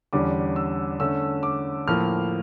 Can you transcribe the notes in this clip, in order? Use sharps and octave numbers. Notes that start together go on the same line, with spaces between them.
E2 D3 G3 C#4 D6
E6
D3 A3 C#4 E6
D6
A2 F3 A#3 F6